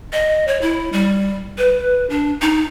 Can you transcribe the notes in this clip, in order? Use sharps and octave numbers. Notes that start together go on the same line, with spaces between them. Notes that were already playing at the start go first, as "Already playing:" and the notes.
D#5
C#5
E4
G3
B4
D4
D#4